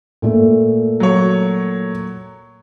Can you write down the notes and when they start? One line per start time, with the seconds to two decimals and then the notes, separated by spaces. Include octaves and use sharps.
0.22 A#2 A3
1.00 F#3 C#5